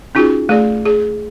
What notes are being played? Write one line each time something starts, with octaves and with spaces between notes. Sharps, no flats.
C#4 D#4 F4 F#4 G#4
A3 G#4 D5
G#4